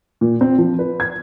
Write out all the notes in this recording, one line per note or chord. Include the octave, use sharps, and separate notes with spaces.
A#2
C4
F3
B4
G#6